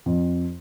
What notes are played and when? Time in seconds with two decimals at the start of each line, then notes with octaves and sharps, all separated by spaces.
0.06 F2